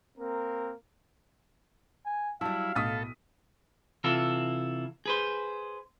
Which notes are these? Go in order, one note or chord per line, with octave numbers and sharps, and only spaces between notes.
A#3 C4 A#4
G#5
F#3 G3 E4 F5 A5
B1 A2 A4 D#6 B6
C3 E3 E4 F4 A4
G#4 B4 C5